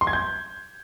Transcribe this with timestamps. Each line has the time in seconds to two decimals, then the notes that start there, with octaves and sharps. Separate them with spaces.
0.01 C6
0.07 G#6
0.13 G6